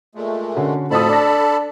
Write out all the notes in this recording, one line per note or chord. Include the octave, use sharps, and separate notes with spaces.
A#2 G#3 A3
D3 C#4 F#4
F2 A2 F#4 A4 A5 B5 D#6
D4 D5 A#6